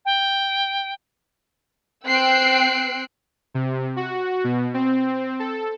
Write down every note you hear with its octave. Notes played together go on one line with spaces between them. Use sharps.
G5
C4 G5 E6 F#6 C7 D7
C3
F#4
B2
C4
A4